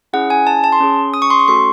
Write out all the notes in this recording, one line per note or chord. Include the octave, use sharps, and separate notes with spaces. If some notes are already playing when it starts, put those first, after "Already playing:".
C#4 E4 G#4 F#5
G#5
A5
A5
C6
C#4 G#4
D#6
C#6
C6
C#6
A3 C#4 F#4 A4 C6